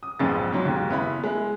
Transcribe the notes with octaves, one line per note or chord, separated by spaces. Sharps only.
D#6
A#1 F2 G#2 B3 G#4 A6
G#2 F#3
D#2 G#2
F#1 B3 E4 B5
G#3 E4